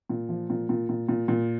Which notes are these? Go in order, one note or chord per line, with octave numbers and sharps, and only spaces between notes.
A#2
F3
A#2
A#2
A#2
A#2
A#2